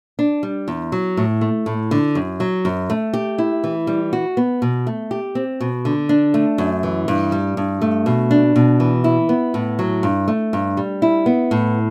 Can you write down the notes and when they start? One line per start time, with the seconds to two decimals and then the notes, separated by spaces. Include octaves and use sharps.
0.19 D4
0.43 G3
0.68 E2
0.92 F#3
1.17 A2
1.41 A3
1.66 A2
1.91 D3
2.15 F#2
2.40 F#3
2.65 F#2
2.90 A3
3.13 G4
3.38 E4
3.64 E3
3.87 G3
4.13 F#4
4.37 B3
4.62 B2
4.87 A3
5.11 G4
5.35 C4
5.61 B2
5.85 D3
6.09 D4
6.34 A3
6.58 F#2
6.83 E3
7.08 G2
7.32 G3
7.57 G2
7.81 A3
8.06 B2
8.31 D4
8.56 B2
8.80 E3
9.04 E4
9.29 B3
9.54 A2
9.79 F#3
10.03 G2
10.28 A3
10.53 G2
10.77 G3
11.02 E4
11.26 B3
11.51 A2